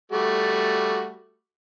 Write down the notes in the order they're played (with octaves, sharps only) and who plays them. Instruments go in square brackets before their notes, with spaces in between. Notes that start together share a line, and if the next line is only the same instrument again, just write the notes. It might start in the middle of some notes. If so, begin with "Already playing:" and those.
[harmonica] G3 A3 F#4